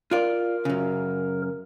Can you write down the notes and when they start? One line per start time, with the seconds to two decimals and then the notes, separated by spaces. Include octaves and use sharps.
0.11 F4 A#4 D5
0.65 F#2 C#3